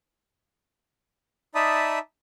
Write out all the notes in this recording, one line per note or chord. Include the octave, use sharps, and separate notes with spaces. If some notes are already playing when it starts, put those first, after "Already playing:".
D#4 D5 E5 A5 B5 D#6